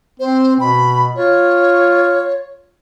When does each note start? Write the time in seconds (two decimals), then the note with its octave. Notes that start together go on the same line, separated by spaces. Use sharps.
0.20 C4 C5
0.60 B2 B5
1.16 F4 C#5